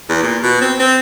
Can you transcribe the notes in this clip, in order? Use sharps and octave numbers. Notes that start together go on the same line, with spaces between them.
E2
A#2
B2
C4
C4